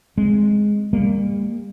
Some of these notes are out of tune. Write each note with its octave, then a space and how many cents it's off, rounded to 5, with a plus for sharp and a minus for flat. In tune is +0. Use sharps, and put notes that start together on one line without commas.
G#3 +0 C4 +0
G3 +40 A#3 -5